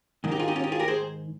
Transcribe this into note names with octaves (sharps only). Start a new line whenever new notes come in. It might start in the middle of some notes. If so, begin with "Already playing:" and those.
G#2 D#3
D#4 G4
F4 G#4
D#4 G4
C#4 F4
D#4 G4
F4 G#4
G4 A#4
G#4 C5